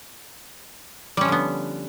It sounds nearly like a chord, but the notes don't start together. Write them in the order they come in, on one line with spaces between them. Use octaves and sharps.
G3 C#4 F3 D3 B3